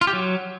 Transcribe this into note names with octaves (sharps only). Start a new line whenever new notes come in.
F4
G4
F#3